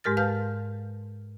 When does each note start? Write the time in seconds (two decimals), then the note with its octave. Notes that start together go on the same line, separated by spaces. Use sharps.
0.04 G#2 G#3 G4 A#4 F6 A6
0.17 B4 F5 A5 F6 G6